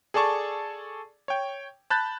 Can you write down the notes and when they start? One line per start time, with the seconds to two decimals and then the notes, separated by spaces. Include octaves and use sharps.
0.14 G#4 A4 D5 A5 C#6
1.28 C#5 G5
1.90 A5 B5 F#6 G6 A6